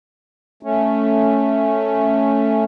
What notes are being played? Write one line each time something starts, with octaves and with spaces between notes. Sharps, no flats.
A3 C#4